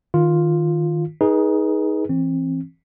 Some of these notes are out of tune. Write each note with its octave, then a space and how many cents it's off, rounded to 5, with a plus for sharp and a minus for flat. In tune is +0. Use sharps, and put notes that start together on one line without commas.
D#3 +0 F4 +0
D#4 +20 G#4 +0 B4 -25
E3 +0 C4 +30